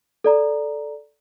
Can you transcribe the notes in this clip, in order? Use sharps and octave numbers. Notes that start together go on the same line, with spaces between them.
A4 D5 A#5